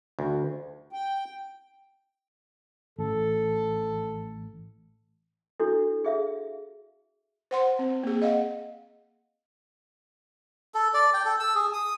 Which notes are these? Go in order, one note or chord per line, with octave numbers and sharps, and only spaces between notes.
D2
G5
A1 A4
D4 E4 F#4 A4
G#4 E5 F5
C5 F#5 C6
C4
A#3 G#4
D#5 F5 F#5
A4
D5
G5
A4
E6
G#4
D#6